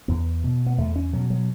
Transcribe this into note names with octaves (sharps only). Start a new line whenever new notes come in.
E2 B3
B2
B3
E2 A3
C#4
B2 F#3
F#3